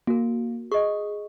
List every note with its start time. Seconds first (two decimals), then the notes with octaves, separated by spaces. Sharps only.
0.07 A#3 F#4 A#4
0.72 G#4 D#5 C#6